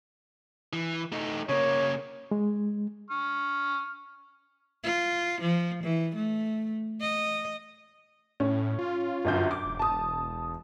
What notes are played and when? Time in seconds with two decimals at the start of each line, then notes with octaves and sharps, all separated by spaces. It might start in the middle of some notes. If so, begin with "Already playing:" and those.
0.73 E3
1.12 A3 D#4
1.49 C#3 A#3 C#5
2.31 G#3
3.10 C#6 F6
4.84 F4
5.41 F3
5.83 E3
6.15 A3
7.00 D#5
8.40 A2 C#4
8.79 F4
9.25 G1 F#2 G6
9.51 D6
9.65 E1
9.79 A5 D#6